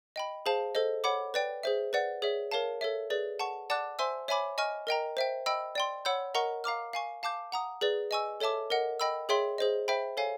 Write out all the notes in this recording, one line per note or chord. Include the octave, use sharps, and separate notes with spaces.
D#5 G5 B5
G#4 C5 F5 A5
A4 C5 D#5
C#5 F#5 B5 D6
B4 D5 G5
G#4 C5 E5
B4 D5 F#5
G#4 C#5 E5
A#4 C#5 F5 A5
A4 C#5 E5
G#4 B4 D5
F#5 A5 C#6
D5 F#5 A5 D6 F#6
C5 E5 G#5 C6 E6
C#5 E5 G#5 B5 D6
D#5 G#5 C#6 F6
A#4 D#5 G5 A#5
C5 E5 G5
D#5 G5 B5 E6
D5 G5 C6
C#5 F#5 B5 E6 G6
A#4 D#5 F#5 A#5 C#6
F5 A#5 D6 F6
F5 G#5 C#6
F5 A5 D6 G6
F#5 A#5 D#6
G#4 B4 D5
D#5 G#5 C#6 E6
A4 C#5 E5 A5 D6
A#4 D#5 F#5
D#5 G5 B5 E6
G#4 C#5 E5 G5 C6
G#4 C5 D#5
C5 E5 G5 B5
A4 C#5 F5 G#5